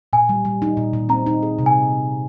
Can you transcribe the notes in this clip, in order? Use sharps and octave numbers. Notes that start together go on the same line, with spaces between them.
A#2 G#5
G3
G3
D#4
A#2
A#2
C4 A#5
D#4
G#4
C3
G#5